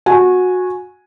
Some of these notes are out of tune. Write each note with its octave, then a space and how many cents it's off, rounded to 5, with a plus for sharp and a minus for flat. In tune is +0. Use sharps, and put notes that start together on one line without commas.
F#4 -20 G#5 +0